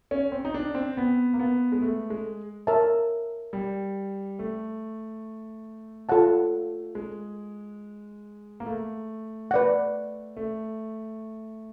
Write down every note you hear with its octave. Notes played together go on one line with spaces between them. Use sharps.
C#4
C4
D#4
D4
C4
B3
A#3
B3
G#3
A3
G#3
A#4 C#5 E5 A5
G3
A3
F4 A4 C#5 F#5 A5
G#3
A#3
A3
B4 D5 F#5
A3